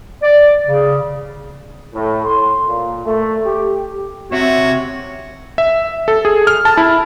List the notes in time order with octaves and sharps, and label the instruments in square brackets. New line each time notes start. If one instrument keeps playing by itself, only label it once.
[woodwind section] D5
C#3
[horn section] A2
C6
A#2
A3
G4
[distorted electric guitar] C3 [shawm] F#4 [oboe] C#5 [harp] E5
[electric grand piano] E5
A4
G#4
F6
A5
E4